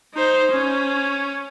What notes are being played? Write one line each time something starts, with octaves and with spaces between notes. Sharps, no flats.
D#4 C5
C#4